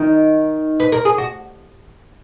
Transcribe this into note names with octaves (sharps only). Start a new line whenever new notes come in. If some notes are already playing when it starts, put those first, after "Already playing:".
Already playing: D#3 D#4
B4
A#4
G#4
F#4